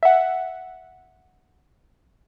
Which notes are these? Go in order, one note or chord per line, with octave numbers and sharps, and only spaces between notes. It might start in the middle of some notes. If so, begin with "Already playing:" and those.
E5 F#5